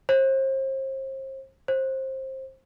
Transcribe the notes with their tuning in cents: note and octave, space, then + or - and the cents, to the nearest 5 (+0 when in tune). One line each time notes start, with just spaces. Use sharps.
C5 +35
C5 +20